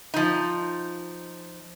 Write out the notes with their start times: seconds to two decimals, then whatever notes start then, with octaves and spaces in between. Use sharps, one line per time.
0.14 F3 D#4